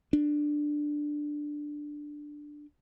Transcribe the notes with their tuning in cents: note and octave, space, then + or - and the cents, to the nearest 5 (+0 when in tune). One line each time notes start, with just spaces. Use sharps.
D4 +5